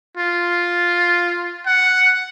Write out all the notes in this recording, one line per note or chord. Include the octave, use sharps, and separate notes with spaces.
F4
F#5